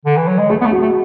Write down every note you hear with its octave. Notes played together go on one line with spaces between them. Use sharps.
D3
E3
F#3
G#3
A3 G#4
B3
A3
F#4
A3